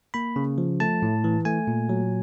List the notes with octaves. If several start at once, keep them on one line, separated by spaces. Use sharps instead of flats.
A#3 B5
C#3
F3
A3 A5
A2
E3
A3 G#5
A#2
F#3